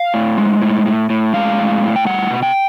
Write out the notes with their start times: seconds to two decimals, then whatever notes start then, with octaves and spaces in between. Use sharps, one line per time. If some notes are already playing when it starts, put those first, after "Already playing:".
Already playing: F5
0.14 A2
0.38 G#3
0.62 A2
0.86 A2
1.10 A2
1.33 G#3 F5
1.58 A2
1.82 A2
1.96 G5
2.06 G3 F#5
2.30 B2
2.43 G5